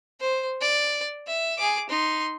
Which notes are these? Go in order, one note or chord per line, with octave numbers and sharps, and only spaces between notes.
C5
D5
E5
G#4 D6
D#4 C6